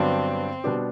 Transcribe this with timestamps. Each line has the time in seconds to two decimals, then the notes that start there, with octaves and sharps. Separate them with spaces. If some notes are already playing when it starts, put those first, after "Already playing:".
Already playing: G2 D3 F#3 B3 C4 D4
0.64 B2 G3 B3 D4 G4